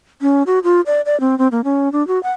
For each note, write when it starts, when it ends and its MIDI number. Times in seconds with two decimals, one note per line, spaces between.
0.21 0.43 61
0.47 0.59 66
0.64 0.81 65
0.86 1.01 74
1.06 1.19 74
1.20 1.38 60
1.38 1.48 60
1.52 1.61 58
1.64 1.92 61
1.92 2.06 62
2.07 2.21 66
2.23 2.31 78